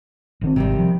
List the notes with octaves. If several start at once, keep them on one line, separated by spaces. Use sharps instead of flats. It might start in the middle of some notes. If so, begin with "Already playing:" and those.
A1 D#3 C4
G#1 C3 D#3 G3
F3